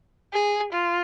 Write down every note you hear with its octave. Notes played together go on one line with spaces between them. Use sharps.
G#4
F4